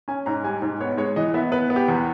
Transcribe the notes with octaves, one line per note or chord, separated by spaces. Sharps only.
C#4 G#5
G#2 A#5
G3 G#5
G#2
B3 C#5
G#3 C#5
E3 D#5
B3 E5
B3 B4
B3
G4
E2